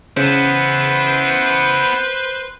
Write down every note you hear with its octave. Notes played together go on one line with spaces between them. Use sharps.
C#3 B3 E4 B4 C5